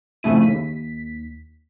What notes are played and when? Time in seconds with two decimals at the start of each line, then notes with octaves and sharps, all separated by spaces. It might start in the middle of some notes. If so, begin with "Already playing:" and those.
0.23 F2 C#3 A3 E4 D#7
0.43 D#2 B6